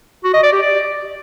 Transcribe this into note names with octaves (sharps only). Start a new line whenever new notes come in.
F#4
D#5
D5
G4
D5